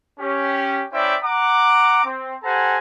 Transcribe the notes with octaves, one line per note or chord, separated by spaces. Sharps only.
C#4 G4
C#4 E4 C5 D5 E5 G5
F#5 A#5 D6
C4
G4 A4 C5 F#5 G#5 A#5